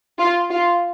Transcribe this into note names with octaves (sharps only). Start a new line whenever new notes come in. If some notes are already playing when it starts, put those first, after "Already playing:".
F4
F4